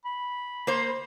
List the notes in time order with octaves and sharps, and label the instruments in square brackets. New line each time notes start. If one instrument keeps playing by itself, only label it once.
[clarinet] B5
[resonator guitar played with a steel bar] A#3 C5